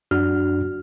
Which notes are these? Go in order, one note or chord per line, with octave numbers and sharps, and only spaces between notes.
F#2 D4 F#4 F6